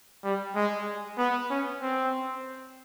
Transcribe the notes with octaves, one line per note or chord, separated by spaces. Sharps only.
G3
G#3
B3
C#4
C4